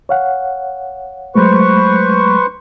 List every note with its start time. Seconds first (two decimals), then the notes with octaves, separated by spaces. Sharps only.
0.09 C#5 F5 F#5
1.35 F#3 G#3 A3 B4 C5 C#6